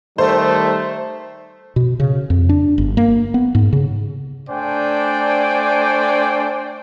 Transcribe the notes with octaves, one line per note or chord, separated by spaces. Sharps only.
D#3 G3 A3 C5
B2
C#3
F2
D4
G1
A#3
B3
G#2
C#3
A3 D4 C5 D5 G5 G#5